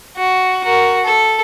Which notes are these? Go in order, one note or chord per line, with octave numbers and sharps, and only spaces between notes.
F#4
F#4 A#4
A4